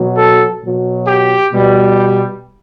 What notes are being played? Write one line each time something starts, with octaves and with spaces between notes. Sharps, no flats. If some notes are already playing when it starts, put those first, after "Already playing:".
Already playing: B2 F#3
A4
B2 F#3
G4
B2 G3